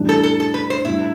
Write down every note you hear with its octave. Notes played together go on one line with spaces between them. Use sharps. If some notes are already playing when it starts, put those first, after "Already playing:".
Already playing: A2 E3 G3 D4
A4
A4
A4
B4
C5
A2 G3 D4 E4